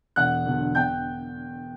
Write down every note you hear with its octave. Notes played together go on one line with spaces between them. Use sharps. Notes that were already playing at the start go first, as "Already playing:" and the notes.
E1 F#5 F#6
E2 D3 F#3
E2 G5 G6